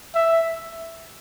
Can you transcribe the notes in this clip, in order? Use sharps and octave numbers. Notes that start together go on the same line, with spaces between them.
E5